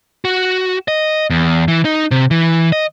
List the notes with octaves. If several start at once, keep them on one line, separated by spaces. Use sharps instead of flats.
F#4
D#5
E2
E3
D#4
C3
E3
D#5